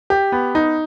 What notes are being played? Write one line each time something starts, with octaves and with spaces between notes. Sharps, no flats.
G4
B3
D#4